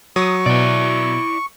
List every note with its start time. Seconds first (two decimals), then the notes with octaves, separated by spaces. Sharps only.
0.16 F#3 C#6 D#6
0.46 B2 E4 D5